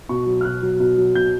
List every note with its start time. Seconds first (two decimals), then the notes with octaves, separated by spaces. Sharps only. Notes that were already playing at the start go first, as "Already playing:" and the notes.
0.09 B2 C#6
0.26 F#3
0.41 F6
0.44 B2 F#6
0.62 F#3
0.80 B2
0.98 F#3
1.15 B2 G6